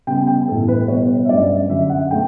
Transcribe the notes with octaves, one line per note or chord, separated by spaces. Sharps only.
C#3 G3 B3 G5
G5
A2 E3 G3 B3 A4
B4
B2 G3 B3 C#5
E5
G2 F#3 A3 C#4 D5
F#2 D3 F#3 E5
F#5
B2 A3 G5